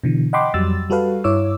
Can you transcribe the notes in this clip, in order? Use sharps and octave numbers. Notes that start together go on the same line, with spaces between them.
B2 D3 E3
D#5 F#5 G5 B5 C6 D6
F2 F#3 G3 E6 A6
G3 F#4 A4 B4 F5
G2 E4 C#5 D6 E6